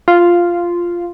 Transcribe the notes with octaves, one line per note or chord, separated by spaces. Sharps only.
F4